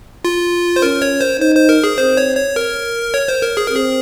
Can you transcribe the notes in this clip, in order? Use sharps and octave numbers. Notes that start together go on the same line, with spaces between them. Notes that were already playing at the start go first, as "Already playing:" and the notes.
F4
C5
C#4 A#4
C#5
C5
D#4 C5
C5
A#4
G#4
C4 C5
C#5
C#5
A#4
C#5
C5
A#4
G#4
A#4
C4 G#4